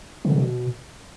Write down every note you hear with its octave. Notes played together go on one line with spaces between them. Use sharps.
C#3
C3
B2